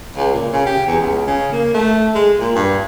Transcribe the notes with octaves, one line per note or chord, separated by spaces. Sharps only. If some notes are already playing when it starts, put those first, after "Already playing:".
C#2
A#2
C#3
G4
E2
C#2
C#3
A#3
A3
G#3
A#2
G2